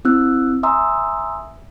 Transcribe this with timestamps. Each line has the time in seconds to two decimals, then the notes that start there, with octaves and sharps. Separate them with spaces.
0.05 C4 E4 E6 F#6
0.63 E5 G#5 A#5 C6 D#6 E6